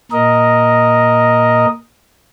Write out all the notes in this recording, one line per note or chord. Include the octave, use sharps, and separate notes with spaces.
A#2 A#4 D#5